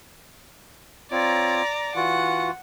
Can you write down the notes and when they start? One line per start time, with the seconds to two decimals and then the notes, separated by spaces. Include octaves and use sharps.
1.12 C4 F4 C#5 D5 A#5
1.96 E3 F4 F#4 F#5